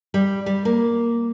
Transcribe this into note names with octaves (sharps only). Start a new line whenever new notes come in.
G3
G3
A#3